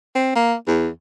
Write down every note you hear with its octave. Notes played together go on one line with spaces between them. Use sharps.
C4
A#3
E2